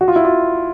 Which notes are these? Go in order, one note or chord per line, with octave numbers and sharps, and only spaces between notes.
F#4
F4
E4
F4